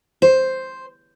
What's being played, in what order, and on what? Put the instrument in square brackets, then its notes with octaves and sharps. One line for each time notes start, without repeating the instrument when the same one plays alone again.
[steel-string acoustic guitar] C5